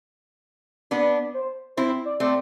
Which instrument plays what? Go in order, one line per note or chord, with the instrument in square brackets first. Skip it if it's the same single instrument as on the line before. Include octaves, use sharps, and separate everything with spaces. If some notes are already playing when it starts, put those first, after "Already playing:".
[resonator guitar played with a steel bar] B3 D4 [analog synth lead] D5
[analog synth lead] C5
[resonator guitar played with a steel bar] C4 E4 [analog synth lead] C5
[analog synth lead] D5
[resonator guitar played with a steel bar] A3 C4 [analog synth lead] D5